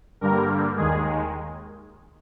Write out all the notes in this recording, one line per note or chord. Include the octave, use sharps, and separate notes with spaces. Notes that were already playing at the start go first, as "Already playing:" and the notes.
G2 D3 G3 A#3 A#4
D#2 D#3 G#3 G#4